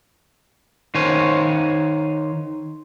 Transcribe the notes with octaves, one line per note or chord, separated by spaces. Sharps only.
D#3 C5 C#5 G#5